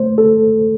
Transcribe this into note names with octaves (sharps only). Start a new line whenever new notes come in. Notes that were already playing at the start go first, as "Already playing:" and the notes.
Already playing: A3 C5
A4